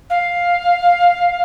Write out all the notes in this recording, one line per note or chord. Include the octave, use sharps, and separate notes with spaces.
F5